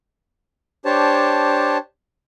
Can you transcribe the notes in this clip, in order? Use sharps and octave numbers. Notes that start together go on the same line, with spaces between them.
D4 G4 C5 C#5 A5